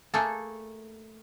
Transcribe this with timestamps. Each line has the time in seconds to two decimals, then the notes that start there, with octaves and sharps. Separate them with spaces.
0.14 A3 A#3 G#4 A4